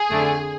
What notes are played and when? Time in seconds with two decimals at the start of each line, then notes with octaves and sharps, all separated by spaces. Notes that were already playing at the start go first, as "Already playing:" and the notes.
Already playing: G#4
0.11 F2 D3 A3